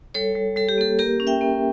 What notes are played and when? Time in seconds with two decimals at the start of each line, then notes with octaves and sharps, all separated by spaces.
0.14 G3 A4 C#5
0.36 G3
0.56 G3 A4
0.69 G4
0.78 A#3 A4
0.99 A#3 G4 A#4
1.20 C#4
1.27 E5 G5
1.41 A#3